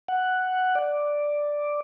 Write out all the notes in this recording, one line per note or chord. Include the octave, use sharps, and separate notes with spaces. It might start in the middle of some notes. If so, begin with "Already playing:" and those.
F#5
D5